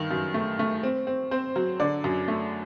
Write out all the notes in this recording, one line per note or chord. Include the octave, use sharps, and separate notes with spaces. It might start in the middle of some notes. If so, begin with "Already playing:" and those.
Already playing: G2 D#3
F#2
A3
A3
C4
C4
C4 C5
F#3
D3 D5
F#2
A3